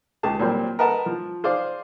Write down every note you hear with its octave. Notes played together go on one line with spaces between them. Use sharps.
C#2 G4 G#4 A5
A#2 F#3 G3 C4
A#4 B4 D#5 F#5 A5
F3
G#4 C5 D5 F5